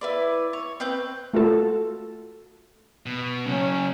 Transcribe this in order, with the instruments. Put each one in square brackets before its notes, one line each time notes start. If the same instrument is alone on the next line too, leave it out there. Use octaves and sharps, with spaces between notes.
[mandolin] E4 B4 D5
C#5
C4 B4 G6
[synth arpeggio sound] A3 F4 F#4 A4
[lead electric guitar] B2
[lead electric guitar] C#3 F#3 [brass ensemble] C#4